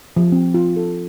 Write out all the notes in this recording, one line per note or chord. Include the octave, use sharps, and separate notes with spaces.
F3
C4
F4
A4